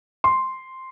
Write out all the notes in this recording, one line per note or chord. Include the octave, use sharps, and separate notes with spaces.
C6